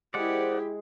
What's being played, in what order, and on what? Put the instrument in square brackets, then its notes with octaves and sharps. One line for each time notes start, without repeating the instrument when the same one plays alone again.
[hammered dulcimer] G#3 [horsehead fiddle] E4 G4 [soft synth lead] C5 [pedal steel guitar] D5 F#5